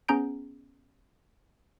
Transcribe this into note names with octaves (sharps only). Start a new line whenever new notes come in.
B3 C#4 G#4 A#5 G6 D7